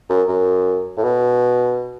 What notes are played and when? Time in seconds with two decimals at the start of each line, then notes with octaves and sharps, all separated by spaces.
0.09 F#2
0.28 F#2
0.97 A2
1.04 B2